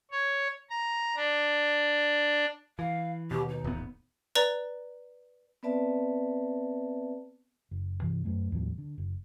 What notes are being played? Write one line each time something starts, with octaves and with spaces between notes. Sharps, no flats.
C#5
A#5
D4
E3 F5
D#2 B2 G4
D#4
D#1 A1 B3
B4 D5 A#5
B3 C4 B4 D5 E5 A5
F#1
G2 C3 E3
F#2 F#3 A3
D#2 A2 F3 G3
D3
F#1